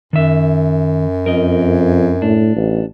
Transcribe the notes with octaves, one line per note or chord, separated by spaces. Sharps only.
F#2 D#3 E5
F2 A#4 D#5
A2 D4
A1